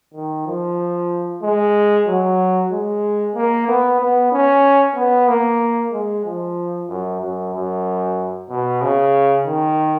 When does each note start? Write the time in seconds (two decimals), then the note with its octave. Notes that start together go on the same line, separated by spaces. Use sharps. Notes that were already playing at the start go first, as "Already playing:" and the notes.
0.14 D#3
0.47 F3
1.42 G#3
2.08 F#3
2.72 G#3
3.35 A#3
3.68 B3
4.00 B3
4.32 C#4
4.96 B3
5.28 A#3
5.92 G#3
6.26 F3
6.89 F#2
7.21 F#2
7.53 F#2
8.50 B2
8.82 C#3
9.46 D#3